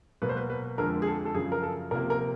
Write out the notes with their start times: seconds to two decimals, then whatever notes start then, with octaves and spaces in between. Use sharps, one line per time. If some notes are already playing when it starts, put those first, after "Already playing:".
0.22 B2 F#3 A#3 B4
0.29 C5
0.37 B4
0.50 B4
0.78 F2 D3 F3 G#3 A#4
1.02 G#4
1.06 A4
1.25 A4
1.35 F#2 C#3 F3 G#4
1.52 A#4
1.63 A4
1.91 C3 F3 A#3 A#4
2.10 A#4